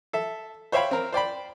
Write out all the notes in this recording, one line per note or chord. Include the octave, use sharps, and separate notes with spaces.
A4 E5
C5 C#5 E5 F5 G5 B5
C4 A#4
C5 D5 G5 B5